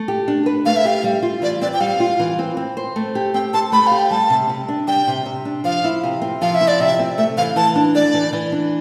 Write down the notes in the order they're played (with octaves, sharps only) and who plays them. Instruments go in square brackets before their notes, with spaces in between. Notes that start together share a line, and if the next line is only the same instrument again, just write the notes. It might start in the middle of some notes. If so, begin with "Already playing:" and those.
Already playing: [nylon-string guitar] A3
G4
D4
B4
[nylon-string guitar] A3 [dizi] F5
[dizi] E5
[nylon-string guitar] G4 [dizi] F5
[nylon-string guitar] G3
F4
[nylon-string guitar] E3 [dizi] D5
[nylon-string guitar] C4 [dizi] D5
[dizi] G5
[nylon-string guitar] G3 [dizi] F5
[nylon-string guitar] F4
E3
C4
C4
C5
A3
G4
[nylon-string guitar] C4 [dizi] G5
[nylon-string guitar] C5 [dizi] A5
[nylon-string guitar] A3 [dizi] B5
[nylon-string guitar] G4 [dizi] F5
[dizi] G5
[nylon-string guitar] G3 [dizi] A5
[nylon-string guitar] C3
C3
D4
[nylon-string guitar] G3 [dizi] G5
[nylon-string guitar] C3
C3
D4
[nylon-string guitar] F3 [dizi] F5
[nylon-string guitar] E4
C3
C4
[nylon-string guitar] F3 [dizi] F5
[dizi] E5
[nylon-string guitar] E4
[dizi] D5
[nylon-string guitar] C3 [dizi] E5
[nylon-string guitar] C4
[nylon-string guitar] A3 [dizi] E5
[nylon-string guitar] E3 [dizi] F5
[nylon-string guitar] E3 [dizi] A5
[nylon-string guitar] D4
[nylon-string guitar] A3 [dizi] D5
[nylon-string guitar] E3
E3
D4